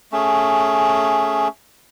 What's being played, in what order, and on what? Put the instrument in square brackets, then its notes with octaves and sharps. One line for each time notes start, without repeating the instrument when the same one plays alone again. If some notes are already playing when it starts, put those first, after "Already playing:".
[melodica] A3 C#4 G#4